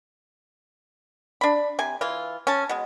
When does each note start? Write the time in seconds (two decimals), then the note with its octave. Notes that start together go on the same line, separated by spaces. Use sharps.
1.41 D4 B5
1.79 C3 G#5
2.01 E3 F4
2.47 C#4 A5
2.69 B2 G#3